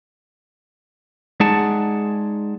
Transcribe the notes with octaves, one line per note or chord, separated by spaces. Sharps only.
G#3 D#4 G#4 D5 F#5 A5